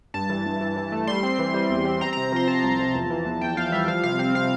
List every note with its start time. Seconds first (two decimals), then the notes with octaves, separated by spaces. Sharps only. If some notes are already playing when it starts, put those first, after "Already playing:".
0.14 G2 A5
0.29 E3
0.46 G2
0.61 E3
0.76 E3
0.92 A3
1.07 G3 C6
1.23 C4
1.39 E3
1.54 G3
1.70 E2
1.85 C4
2.01 C4 A#5
2.13 C3 A#5
2.32 F3 C6
2.48 F3 A5
2.63 C2
2.79 F3
2.95 E2
3.10 E3
3.25 E2
3.41 E2 G5
3.57 E2 F5
3.72 G3 E5
3.88 F3 F5
4.04 C3 F5
4.19 C4 F5
4.35 C3 F5